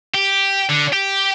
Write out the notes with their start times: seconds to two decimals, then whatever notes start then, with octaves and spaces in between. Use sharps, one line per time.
0.15 G4
0.70 D3
0.93 G4